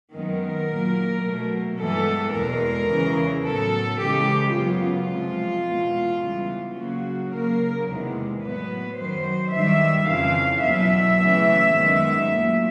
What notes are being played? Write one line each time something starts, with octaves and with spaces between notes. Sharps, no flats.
F#2 D#3 G#3 B3 A#4
A#2 F#3 A#3
B2 F#3 A3
G2 E3 G#3 B3 A4
E2 B2 G#3 A#4
E2 C#3 E3
A2 F#3 B3 A4
C#3 E3 G#3 G4
F#2 C#3 F#3 B3 F4
C3 F3 G#3
E2 B2 G#3
C#3 E3 G3 B3
C#3 F#3 A#3 F#4
C#3 F#3 A#3 A#4
E2 C3 D#3 G#3 B3
A2 F#3 B3 B4
F#2 D#3 F#3 C5
G2 D#3 G3 E5
F2 C#3 E3 F5
E2 B2 F#3 B3 E5
C#3 E3 A3
F#2 D#3 G#3 B3
A#2 F#3 A3